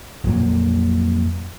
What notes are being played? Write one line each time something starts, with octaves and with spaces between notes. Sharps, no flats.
F2 A#2 F#3